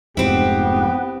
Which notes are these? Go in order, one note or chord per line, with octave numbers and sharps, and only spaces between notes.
F1 F2 G#2 B3 C4 E4 G4